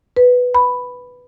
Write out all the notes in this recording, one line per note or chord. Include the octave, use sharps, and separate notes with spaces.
B4
B5